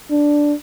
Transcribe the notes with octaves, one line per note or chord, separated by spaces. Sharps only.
D4